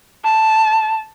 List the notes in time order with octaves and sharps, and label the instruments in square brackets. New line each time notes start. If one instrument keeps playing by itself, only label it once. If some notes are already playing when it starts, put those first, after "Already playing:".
[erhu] A5